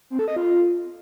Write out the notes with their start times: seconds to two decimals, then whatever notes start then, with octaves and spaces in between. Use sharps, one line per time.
0.10 C4
0.19 A4
0.28 D#5
0.36 F4